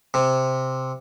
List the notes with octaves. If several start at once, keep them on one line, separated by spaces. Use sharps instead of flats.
C3